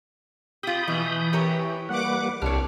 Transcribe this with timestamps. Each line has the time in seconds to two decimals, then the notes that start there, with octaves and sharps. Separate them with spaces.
0.63 F4 G4 B5 D#6 G6
0.88 B2 E3
1.33 G4 A#4 C#5
1.89 G3 A#3 B4 F#5 D6
2.42 C2 D4 G4 C#5 F6